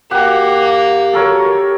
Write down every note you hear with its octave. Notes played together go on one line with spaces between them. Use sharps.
A#3 G4 F#5
A4 A#4 C#5